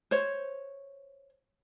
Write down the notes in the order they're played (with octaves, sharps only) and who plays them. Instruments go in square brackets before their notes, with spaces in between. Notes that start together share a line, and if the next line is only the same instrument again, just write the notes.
[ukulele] C5 C#5